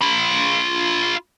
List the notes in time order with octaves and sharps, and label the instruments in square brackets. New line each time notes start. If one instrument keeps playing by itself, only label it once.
[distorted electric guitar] F4 B5